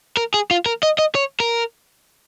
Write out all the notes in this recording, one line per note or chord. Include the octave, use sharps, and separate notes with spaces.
A#4
G#4
F4
A#4
D#5
D#5
C#5
A#4